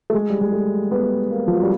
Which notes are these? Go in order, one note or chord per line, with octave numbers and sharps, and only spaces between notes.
A3
G#3
G3
G#3
A3
B3
A#3
F3
F#3
G3